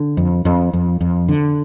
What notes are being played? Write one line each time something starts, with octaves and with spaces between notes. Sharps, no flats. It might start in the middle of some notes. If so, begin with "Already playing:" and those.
Already playing: D3
F2
F2
F2
F2
D3